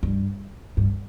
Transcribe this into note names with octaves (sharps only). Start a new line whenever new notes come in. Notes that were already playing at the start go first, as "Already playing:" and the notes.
G2
G2